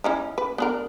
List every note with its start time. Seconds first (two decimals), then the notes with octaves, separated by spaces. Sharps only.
0.04 C#4 D#4 E4
0.38 B4
0.58 B3 D4 A#4